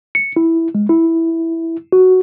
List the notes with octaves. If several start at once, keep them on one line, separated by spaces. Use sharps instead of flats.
C#7
E4
G#3
E4
F#4